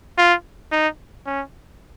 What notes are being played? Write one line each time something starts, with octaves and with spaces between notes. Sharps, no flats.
F4
D#4
C#4